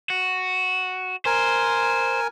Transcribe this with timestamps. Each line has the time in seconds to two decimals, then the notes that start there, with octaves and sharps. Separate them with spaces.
0.10 F#4
1.26 A#4 C5 G#5